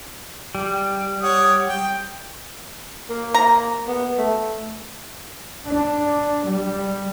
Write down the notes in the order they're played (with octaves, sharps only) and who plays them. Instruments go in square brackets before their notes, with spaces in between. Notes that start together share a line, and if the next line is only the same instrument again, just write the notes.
[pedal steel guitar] G3
[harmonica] C#5 F#5 D#6
G5
[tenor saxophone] A#3
[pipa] A#5
[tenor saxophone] B3
A3
[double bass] D4
G3